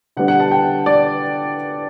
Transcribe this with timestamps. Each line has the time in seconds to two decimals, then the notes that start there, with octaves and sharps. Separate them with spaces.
0.17 D3 G3 B3 D4 F#5
0.28 F#5
0.40 A5
0.51 G5
0.86 D5